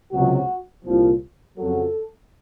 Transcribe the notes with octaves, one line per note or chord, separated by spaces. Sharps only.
C#2 C3 F#3 F#4
C2 A#2 F3
F2 C#3 F#3 A4